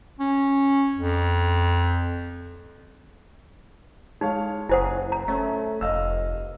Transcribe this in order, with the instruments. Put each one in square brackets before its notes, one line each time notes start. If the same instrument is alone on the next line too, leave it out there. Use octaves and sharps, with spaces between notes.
[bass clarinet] C#4
F2
[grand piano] G#3 C#5 F5 [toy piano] D#4
[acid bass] F#1 [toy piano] E4 C5 F#5 [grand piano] G#5 D#6
[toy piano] A#5
[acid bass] A3 [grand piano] C#4
[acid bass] F1 [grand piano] D#5 F5 E6